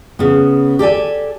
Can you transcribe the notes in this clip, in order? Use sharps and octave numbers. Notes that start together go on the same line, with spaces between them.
C#3 B3
G4 A4 D5 G#5